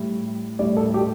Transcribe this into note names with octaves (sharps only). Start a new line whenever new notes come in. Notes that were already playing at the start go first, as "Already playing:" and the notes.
Already playing: A2 G3
A2 G3 D5
A4
G4